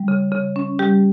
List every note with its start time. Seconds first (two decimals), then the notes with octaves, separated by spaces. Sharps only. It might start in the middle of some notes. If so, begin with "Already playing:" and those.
Already playing: G3
0.08 C#3
0.32 C#3
0.56 C#4
0.79 G3 G4